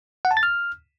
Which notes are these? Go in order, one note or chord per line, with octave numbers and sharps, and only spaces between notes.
F#5
A5
A6
F6